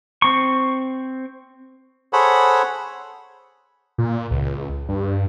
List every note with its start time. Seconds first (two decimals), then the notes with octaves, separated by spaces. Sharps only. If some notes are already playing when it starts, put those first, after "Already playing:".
0.22 C4 C#6
2.13 G#4 A4 C5 C#5 F#5 B5
3.98 A#2
4.31 C#2
4.89 G2